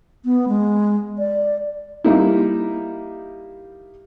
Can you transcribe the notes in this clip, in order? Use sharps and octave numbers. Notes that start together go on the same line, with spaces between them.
B3
G#3
D5
G3 A#3 D#4 E4